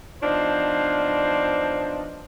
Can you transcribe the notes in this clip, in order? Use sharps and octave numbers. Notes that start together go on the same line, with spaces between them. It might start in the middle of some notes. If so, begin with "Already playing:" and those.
F3 B3 D4 D#4 C5